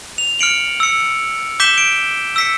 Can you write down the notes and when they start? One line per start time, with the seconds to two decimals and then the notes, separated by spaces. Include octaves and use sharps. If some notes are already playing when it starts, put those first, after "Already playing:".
0.18 F7
0.39 F6 C#7 D7 F#7
0.80 E6 C#7
1.60 D6 G6 B6 E7 G7
1.78 D7
2.36 E6 B6 C#7